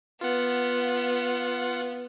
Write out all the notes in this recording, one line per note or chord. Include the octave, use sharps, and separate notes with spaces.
B3 F4 F#5